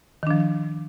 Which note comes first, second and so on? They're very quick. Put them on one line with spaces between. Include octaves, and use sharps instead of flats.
D#3 D4 F3